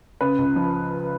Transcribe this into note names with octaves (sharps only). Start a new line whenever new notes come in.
C#3 B4
C#2
F3